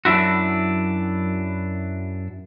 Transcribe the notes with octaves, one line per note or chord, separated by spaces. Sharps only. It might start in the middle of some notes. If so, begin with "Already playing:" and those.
F#2 D4 E4 F#4